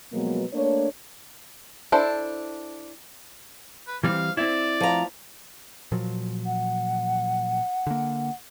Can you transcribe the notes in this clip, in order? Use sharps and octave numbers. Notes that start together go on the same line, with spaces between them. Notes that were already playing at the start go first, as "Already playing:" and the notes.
B2 F3 F#3 G#3 A#3 B3
A3 A#3 D4 C#5
D4 E4 A4 C5
B4
E3 G3 C4 F5
C4 E4 D5
F3 A#5
A#2 F3 F#3
F#5
D3 A#3